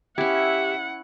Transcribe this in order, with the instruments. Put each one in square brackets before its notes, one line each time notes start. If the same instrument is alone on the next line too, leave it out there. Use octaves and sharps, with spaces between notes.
[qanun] C#4 E4 [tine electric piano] G4 [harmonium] E5 [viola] F#5